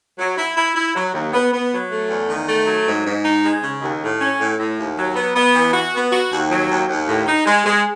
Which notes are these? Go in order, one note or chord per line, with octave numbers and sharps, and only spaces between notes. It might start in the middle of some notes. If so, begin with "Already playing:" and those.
F#3
E4
E4
E4
F#3
D#2
B3
B3
F#3
A3
E2
D#3
A3
F#3
G#2
G#2
D#4
G#3
C#3
D#2
A2
C#4
A2
A2
D#2
F#3
B3
B3
E3
F#4
B3
F#4
D#2
F#3
D#2
D#2
A2
D#4
G#3
G#3